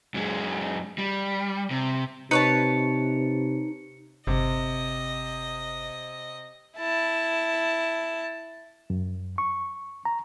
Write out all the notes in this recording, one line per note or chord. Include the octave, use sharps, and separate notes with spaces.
F#2 G#3
G3
C3
C3 D#4 B4 C#5 A5 C#7
G1 C3 D#5
E4 A5
F#2
C#6
A#5